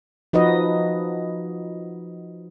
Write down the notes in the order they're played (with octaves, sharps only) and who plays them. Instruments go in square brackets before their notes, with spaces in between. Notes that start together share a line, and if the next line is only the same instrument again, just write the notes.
[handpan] F3 D#4 F#4 B4 D#5